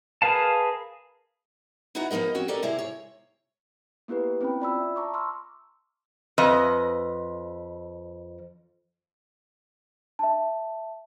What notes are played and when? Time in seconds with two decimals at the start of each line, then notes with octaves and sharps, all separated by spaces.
0.22 G#4 A#4 B4 F5 A5
1.95 B3 D#4 E4 F#4 F#5 A#5
2.11 F3 A#3 B3 A#4 D#5
2.35 C4 C#4 F#4 G5
2.48 G4 A4 A#4 D5 D#5
2.63 C3 E4 G#4 A#5
2.79 C#5
4.08 A#3 B3 E4 G4 B4
4.41 C4 C#4 E4 G5 B5
4.60 F4 D5 B5 E6
4.80 E5
4.96 A5 A#5 C#6 D6
5.14 C6 C#6 E6 F6
6.38 F2 B4 D#5
10.19 E5 A5